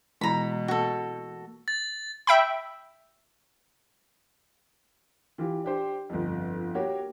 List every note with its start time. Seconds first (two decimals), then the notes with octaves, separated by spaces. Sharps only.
0.21 B2 E3 G#3 A#5 B5
0.68 A#3 F#4 A4
1.68 A6
2.27 E5 G5 B5
5.38 E3 F4 G4
5.64 D4 G4 C5
6.09 G1 F2
6.75 A#3 F#4 G4 C#5